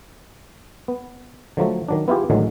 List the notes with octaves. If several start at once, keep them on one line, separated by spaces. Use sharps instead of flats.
B3
D3 F3 F#3 A3
D#3 F#3 D4
B3 E4 F4 G4 G#4
A1 A2 D3 D#3 F#3 G#3